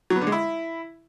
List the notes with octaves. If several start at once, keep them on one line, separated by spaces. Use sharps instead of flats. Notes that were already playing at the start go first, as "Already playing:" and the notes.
F#3
B3
D3
G#3
E4